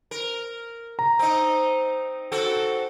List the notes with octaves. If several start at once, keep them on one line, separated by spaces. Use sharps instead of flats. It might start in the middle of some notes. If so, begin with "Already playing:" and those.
A#4
A#5
C4 D#4
C4 F#4 A4